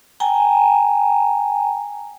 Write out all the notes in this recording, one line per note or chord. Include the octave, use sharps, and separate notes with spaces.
G5 G#5 A#5